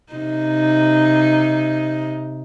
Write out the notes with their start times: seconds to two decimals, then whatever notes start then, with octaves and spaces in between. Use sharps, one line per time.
0.13 C3 D#4